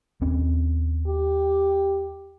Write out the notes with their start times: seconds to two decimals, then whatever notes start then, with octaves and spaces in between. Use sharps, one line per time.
0.21 D#2 C4 C#4
1.07 G4